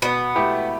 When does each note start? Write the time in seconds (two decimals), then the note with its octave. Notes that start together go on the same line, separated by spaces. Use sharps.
0.02 B2 B3
0.35 A3 E4 G4 B4